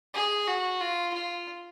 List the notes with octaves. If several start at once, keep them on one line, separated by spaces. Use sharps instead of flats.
G#4
F#4
F4
F4